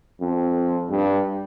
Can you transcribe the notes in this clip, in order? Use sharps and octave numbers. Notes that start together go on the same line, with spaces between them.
F2
G2